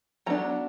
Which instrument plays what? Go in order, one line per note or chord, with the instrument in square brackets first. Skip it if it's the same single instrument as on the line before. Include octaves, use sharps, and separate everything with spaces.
[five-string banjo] F#3 B3 D4 A#5